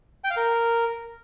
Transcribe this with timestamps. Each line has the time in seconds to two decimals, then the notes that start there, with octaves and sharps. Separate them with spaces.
0.24 G5
0.30 F5
0.37 A#4